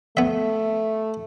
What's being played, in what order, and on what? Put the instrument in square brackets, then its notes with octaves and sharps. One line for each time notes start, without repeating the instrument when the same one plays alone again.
[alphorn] A3 [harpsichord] B3 E5